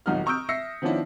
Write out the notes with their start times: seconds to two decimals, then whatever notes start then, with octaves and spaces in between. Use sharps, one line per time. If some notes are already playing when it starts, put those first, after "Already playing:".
0.06 D#1 B1 D#4 F#4 F6
0.26 A#5 C#6 D#6 E6 G6 D7
0.49 E5 E6 A#6 C7 C#7
0.82 D#3 F3 B3 C#4 D4 E4